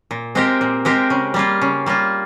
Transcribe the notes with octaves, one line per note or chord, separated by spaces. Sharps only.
A#2
G#3 C4 G4 A#4
A#2
G#3 C4 G4 A#4
C#3
G3 A#3 F4
C#3
G3 A#3 F4